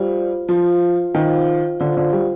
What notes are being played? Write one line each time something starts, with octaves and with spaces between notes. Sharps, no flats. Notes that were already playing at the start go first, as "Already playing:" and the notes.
Already playing: G3 F4 C5 F5
F3 F4 C5 F5
D#3 F4 C5 F5
D3 F4 C5 F5
D3
G3